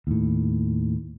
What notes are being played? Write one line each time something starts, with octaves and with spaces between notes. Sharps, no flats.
D#2 A2